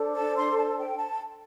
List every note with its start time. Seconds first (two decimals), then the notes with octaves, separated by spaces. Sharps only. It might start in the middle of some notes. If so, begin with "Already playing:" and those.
Already playing: D4 A4 C5
0.16 A5
0.36 C6
0.57 A5
0.78 G5
0.98 A5